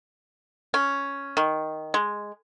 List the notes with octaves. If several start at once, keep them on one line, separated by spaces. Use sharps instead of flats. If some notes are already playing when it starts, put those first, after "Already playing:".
C#4
D#3
G#3